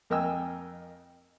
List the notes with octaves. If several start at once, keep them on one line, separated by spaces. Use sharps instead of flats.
F2 A#4 D#5 G5 G#5 E6